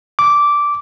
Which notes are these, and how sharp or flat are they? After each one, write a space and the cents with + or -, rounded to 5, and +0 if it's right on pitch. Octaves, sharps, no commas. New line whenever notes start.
D6 -10